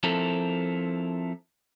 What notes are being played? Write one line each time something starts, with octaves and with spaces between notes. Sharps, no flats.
F3 C4 E4 A4 A#4